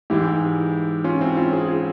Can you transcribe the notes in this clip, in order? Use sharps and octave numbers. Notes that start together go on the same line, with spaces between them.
G#2 E3 G#3 E4 G4
C#4 F4
C4 E4
C#4 F4
F4 G#4
F4 G#4